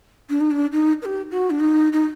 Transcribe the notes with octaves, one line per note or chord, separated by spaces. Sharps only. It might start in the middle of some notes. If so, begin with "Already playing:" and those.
D4
D#4
D4
D#4
B4
G4
F#4
D4
D#4
D#4